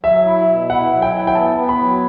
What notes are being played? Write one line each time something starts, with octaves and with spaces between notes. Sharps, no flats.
F#3 E5
E4
B2
E4 F#5
F#3
G5
E4
G5
B3 A5
B3
B5
F#3